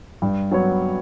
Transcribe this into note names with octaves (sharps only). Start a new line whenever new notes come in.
G2
F#3 B3 F#4 C#5